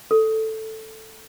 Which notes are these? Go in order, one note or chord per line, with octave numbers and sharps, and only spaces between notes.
A4